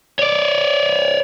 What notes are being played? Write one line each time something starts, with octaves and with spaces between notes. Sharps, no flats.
C#5 D5